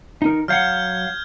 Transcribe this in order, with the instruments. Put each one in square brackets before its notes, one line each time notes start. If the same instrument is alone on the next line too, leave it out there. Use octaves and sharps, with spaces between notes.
[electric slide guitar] D#4 A#4
[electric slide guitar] F#3 F5 F#5 [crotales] F6 G6 G#6